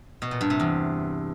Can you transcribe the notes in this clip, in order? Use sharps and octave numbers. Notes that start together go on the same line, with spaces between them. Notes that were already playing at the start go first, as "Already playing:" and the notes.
B2
A#2
G2
C3
E2